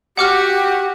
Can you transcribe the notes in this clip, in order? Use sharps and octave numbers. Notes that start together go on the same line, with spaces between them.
F#4 G4 F#5 D6 F6